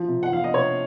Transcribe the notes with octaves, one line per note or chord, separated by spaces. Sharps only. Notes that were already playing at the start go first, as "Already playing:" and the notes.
Already playing: F3
C3
F#5
F3 F5
D#5
C3 C#5